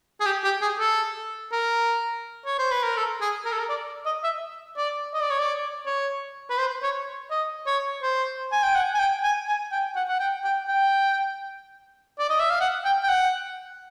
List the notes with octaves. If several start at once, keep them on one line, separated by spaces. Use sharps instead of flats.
G#4
G4
G4
G#4
A4
A#4
C#5
C5
B4
A#4
A4
G#4
A#4
A4
A#4
D5
D#5
E5
D5
D#5
D5
C#5
D5
C#5
B4
C5
C#5
D#5
C#5
C5
G#5
G5
F#5
G#5
G5
G#5
G#5
G5
F#5
F#5
G5
G5
G5
D5
D#5
E5
F5
F#5
G5
G5
F#5